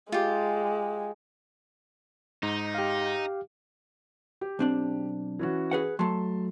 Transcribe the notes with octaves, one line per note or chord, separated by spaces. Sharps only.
G#3 F4 G4
G#2 D#4
G4 F5
G4
B1 C4 D4
E3 C#4 F#4
G#4 B4 F#5
F#3 A3 A5 C6